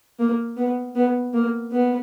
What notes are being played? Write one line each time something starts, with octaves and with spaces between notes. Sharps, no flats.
A#3
B3
B3
A#3
B3